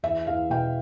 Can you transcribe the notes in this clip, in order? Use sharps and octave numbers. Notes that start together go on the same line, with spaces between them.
E2 E5
E2 F5
B2 G5